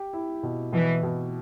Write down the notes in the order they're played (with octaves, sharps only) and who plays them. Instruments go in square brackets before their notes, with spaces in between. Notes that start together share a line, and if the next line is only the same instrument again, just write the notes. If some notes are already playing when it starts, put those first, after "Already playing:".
Already playing: [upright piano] G4
E4
B2
[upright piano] B2 [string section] E3
[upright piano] B2